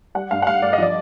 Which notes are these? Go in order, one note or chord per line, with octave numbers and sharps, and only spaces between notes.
G3 F#5
G2 F5
F#5
G2 F5
G2 D5
D#5
F3 D5